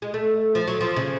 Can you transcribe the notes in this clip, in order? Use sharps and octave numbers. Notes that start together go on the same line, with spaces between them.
G#3
A3
F3
F#3
F3
C#3